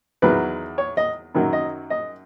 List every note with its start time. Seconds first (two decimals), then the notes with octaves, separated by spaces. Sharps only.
0.22 E2 D#3 F#3 B4
0.78 C#5
0.97 D#5
1.34 F#2 D#3 F#3
1.53 D#5
1.90 D#5